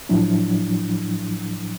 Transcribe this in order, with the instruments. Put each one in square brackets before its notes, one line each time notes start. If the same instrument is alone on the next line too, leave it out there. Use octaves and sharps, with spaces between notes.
[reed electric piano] A2 F3 F#3 D4 E4